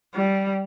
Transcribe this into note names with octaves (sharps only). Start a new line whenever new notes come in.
G3